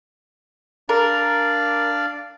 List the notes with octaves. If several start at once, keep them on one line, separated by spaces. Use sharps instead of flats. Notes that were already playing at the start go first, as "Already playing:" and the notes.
D4 A#4 D5 F5